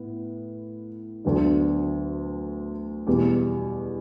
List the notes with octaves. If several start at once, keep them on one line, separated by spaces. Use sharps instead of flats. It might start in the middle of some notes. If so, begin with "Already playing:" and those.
Already playing: A2 B3
D2 D3 F#3 B3 D4
E2 B2 G3